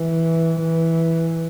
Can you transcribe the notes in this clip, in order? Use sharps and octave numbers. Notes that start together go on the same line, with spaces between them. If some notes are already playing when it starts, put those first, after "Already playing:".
Already playing: E3
E3